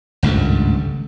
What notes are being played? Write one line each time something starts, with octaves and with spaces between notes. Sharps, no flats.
G#1 C#2 G2 A3